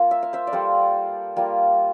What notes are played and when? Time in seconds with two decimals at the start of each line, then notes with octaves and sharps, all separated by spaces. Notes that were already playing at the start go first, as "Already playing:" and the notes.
Already playing: A#3 F4
0.11 E5
0.23 F5
0.33 C5 E5
0.47 D5
0.52 G3 A#3 F4 A4 C5
1.37 G3 A#3 F4